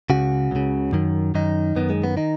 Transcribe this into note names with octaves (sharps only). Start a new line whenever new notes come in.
C#2 C#3 F#4
C#2 C#3
F#2 D#3
F#2 D#3 D#4
F#2 D#3 B3
G#3
B3
D#3 D#4